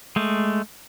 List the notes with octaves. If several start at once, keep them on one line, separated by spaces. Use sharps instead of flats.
G#3 A3